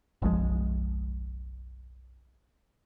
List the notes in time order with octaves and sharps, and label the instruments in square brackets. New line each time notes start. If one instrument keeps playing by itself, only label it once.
[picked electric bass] F#1 B1 F3 G#3